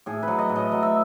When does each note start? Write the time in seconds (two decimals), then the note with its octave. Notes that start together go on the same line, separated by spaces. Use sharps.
0.06 A2 G#4
0.23 F#3 B4
0.39 D#5
0.49 A2
0.56 D#5
0.72 F#3 D#5
0.83 E5